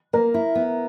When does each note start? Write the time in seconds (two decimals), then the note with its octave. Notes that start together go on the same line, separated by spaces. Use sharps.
0.13 A#3 A#4
0.34 E4
0.55 B3